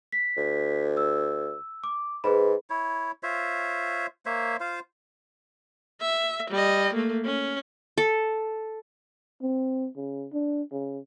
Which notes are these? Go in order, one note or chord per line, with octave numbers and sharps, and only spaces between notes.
B6
D2
E6
D6
G#2 G#4 B4 B5
E4 C#5
F4 C5 C#5 E5
A#3 C5 C#5 E5
F4 C5 F5
E5
G3 D#5
A3 A#3
C#4
A4
C4
C#3
D4
C#3